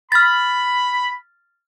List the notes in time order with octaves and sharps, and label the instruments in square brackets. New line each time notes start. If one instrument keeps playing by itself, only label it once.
[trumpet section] B5 [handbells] F6 A6